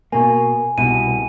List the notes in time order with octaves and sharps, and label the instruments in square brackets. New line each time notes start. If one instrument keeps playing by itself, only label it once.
[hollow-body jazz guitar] B2 A#3 [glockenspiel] G#5
[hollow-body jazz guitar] C2 B2 [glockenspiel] D#7